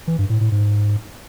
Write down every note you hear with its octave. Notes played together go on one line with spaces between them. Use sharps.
E3
G2
A2
A2
G#2